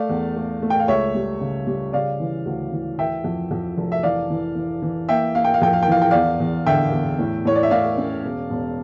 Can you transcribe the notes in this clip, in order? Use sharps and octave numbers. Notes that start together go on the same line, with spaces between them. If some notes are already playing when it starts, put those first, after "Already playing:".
Already playing: A3 D5 F5
E2
A3
A3
G5
F5
C#2 C#5 E5
G3
C#3
G3
C#3 D5 F5
E3
D2
E3
E3 E5 G5
F2
F2
F1
E5
E3 D5 F5
E3
E3
E3
A#3 E5 G5
A#3 F5
G5
F5
F2 G5
F5
G5
E3 F5
G5
E2 D5 F5
E2
D3 E5 G5
E2
A2
A2 C#5
D5
E5
A2 D5 F5
C#4
E1
E1